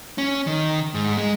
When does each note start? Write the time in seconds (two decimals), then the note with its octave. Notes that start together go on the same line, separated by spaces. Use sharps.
0.18 C#4
0.47 D#3
0.94 G#2
1.17 G#3